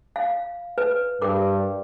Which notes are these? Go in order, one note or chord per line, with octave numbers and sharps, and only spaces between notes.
F5
B4
G2 A#4 D6